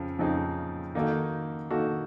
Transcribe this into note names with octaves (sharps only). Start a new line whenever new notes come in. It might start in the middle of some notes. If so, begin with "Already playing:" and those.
Already playing: F2 C#3 F3 C4
F2 C#3 F3 C4 D#4
D#3 A#3 D#4 F#4 A4
D#3 A#3 D#4 F#4 A4